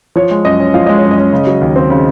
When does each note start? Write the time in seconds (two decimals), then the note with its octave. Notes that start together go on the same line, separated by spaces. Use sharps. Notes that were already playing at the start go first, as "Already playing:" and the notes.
0.16 F3 C#5
0.31 G#3
0.45 F#2 D#5
0.60 C#4
0.74 F3 F5
0.86 G#3 D#5
0.98 C#5
1.03 F#2
1.11 D#5
1.18 C#4
1.33 C#3
1.47 F#3
1.61 D#2
1.76 C4
1.90 C#3